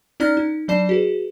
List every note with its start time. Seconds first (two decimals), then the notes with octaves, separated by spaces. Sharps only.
0.20 C#4 D#4 D5 A#5 F6 A#6
0.37 D#4
0.68 F#3 D4 D5 A5 C7 E7
0.89 F#4 G#4 B4